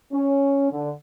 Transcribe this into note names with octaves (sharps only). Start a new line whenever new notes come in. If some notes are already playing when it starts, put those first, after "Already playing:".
C#4
D3